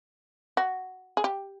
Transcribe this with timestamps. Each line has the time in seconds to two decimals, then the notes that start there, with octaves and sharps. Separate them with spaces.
0.57 F#4
1.17 G#4
1.24 G4